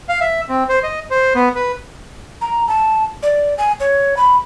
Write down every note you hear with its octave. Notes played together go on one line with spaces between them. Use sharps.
F5
E5
C4
C5
D#5
C5
B3
B4
A#5
A5
D5
G#5
C#5
B5